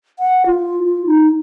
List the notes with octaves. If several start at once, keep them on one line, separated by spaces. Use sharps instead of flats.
F#5
F4
F4
D#4